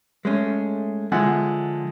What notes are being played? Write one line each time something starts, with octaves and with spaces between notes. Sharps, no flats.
G#3 A3 C#4
D3 F3 G#3 E5 F#5